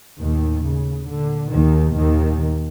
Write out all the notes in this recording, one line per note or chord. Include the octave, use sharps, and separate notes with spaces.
D#2 A2 D#3
C#3
A#2 D3
D#2 D#3
D#2 A#2 D#3